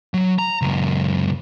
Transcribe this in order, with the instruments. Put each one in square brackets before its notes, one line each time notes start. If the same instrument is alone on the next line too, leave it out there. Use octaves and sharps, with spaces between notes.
[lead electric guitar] F#3
A#5
C#2 F#2